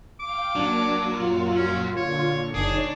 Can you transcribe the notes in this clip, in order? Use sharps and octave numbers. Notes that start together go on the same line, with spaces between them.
F5 G5 D6
F#3 A#3 D4
F#2 A#2 F4 F#4
C#4
A#2 D3 C#5
F#1 D4 D#4 G#4 C#5